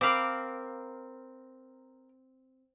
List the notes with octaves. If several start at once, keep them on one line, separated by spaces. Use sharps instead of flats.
C4 A#4 F5 B5 D6